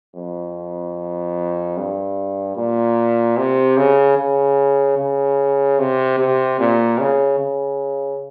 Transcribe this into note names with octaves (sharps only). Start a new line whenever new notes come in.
F2
G2
A#2
C3
C#3
C#3
C#3
C3
C3
A#2
C#3
C#3